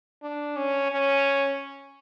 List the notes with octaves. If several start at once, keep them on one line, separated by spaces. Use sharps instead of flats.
D4
C#4
C#4